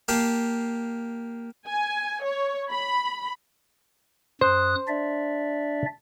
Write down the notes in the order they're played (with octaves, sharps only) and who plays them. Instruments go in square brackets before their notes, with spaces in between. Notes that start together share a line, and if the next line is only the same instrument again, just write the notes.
[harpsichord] A#3 G4 F5 A5
[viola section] G#5
C#5
B5
[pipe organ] F#2 D#6 F#6 [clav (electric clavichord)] C5
[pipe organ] D4 D5 E5